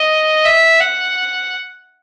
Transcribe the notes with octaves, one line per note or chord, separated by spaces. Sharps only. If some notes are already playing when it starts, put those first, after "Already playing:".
Already playing: D#5
E5
F#5